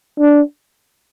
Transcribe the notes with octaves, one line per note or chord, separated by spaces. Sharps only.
D4